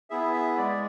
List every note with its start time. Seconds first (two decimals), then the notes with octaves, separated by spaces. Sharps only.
0.10 B3 E4 G#4 E5
0.33 E5
0.57 G#3 D5